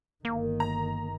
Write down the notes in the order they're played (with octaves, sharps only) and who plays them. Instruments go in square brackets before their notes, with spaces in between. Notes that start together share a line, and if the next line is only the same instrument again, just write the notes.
[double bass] G1 D#3 [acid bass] A#3
[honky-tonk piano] A#5